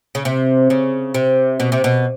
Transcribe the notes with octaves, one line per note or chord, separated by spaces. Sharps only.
C#3
C3
C#3
C3
B2
C3
B2